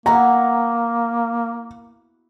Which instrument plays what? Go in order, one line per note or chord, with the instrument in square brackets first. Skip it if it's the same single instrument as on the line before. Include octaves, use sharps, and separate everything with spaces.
[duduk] A#3 [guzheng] B3 E4 F#4 [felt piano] A#5